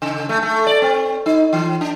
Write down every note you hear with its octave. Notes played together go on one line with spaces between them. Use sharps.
C#3
A3
A3
D5
C4
D#4
E3
D4